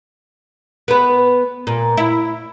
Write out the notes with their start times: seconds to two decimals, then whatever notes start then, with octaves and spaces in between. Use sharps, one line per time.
0.88 B3 B4
1.67 A#2
1.97 E4